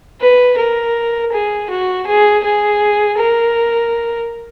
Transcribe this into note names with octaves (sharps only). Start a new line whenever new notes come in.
B4
A#4
G#4
F#4
G#4
G#4
A#4